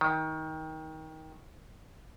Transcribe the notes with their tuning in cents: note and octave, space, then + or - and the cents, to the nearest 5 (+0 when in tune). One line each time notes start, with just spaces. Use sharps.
D#3 +20